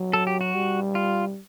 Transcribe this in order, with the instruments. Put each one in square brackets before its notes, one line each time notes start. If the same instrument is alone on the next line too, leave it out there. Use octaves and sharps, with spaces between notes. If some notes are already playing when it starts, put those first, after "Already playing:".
Already playing: [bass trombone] F#3
[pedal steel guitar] A4
G4
F#4
[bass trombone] G3
[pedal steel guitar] F4